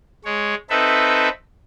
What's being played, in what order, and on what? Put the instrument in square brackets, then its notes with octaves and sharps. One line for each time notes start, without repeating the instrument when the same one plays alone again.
[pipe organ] G#3 C#5
C4 D#4 A4 B4 E5